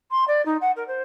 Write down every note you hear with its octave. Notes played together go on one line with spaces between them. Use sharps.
C6
D5
D#4
F#5
A#4
C5